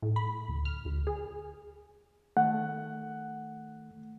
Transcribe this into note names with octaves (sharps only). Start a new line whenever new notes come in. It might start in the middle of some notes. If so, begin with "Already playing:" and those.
A2
B5
D2
F6
D2
G#4
D#3 A3 F#5